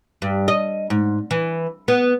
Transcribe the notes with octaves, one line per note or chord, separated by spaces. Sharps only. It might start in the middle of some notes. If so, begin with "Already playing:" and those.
G2
D#5
G#2
E3
B3